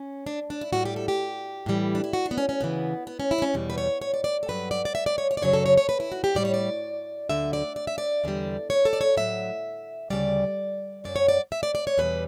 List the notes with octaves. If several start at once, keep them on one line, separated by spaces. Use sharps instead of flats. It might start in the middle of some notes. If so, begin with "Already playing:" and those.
Already playing: C#4
D4
D4
E4
A2 G3 F#4
G4
A4
G4
A2 E3 G3
D4
E4
F#4
D4
B3
C#4
C#4
D2 C#3 E3 B3
B3
C#4
E4
D4
C#4
E2 B2 G3
B4
C#5
C#5
D5
D5
A4
G2 F#3 B4
D5
D5
E5
D5
C#5
C#5
D5
F#2 C#3 F#3 C#5
A4
C#5
C#5
B4
E4
F#4
G4
A2 G3 D5
C#5
D5
D2 D3 F#3 E5
D5
D5
E5
D5
E2 D3 G3
C#5
A4
D5
C#5
A2 F#3 E5
D2 C#3 G3 D5
F#2 C#3 F#3 D5
C#5
D5
E5
D5
D5
C#5
E2 B2 G3 B4